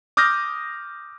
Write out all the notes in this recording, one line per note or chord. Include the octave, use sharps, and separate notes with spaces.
D6 D#6 F6 G6 A#6